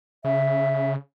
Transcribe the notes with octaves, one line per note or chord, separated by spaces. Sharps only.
C#3 E5